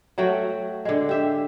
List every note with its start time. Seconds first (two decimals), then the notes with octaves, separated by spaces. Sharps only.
0.18 F#3 A3 F#4 G5
0.85 D3 G#3
1.09 G4 E5